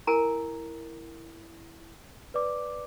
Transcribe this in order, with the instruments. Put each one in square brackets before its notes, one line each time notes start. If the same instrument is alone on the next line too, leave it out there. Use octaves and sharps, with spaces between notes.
[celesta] E4 [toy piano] A#4 G#5 A#5
[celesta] B4 D5 D6